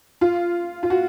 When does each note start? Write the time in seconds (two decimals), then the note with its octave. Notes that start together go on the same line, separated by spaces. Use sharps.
0.21 F4
0.83 F4
0.90 F#4